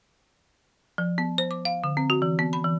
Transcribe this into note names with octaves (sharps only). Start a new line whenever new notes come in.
F3
B3
C5
D6
F5
D3
C4
F#4
E3
B3
B5
E3